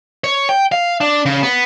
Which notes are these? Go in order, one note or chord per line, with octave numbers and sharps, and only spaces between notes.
C#5
G5
F5
D4
C#3
B3